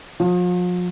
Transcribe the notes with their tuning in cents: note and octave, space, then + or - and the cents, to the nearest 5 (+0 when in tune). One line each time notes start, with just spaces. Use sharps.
F3 +40